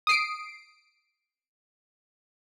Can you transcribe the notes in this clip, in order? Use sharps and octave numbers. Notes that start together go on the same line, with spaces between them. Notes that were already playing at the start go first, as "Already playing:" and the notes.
D#6 C7 D7